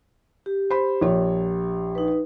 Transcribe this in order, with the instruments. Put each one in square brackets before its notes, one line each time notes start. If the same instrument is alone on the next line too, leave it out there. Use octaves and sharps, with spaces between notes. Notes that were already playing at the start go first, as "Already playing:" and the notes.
[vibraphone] G4
[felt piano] C5 B5
A#1 C#5
[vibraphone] D#4 B4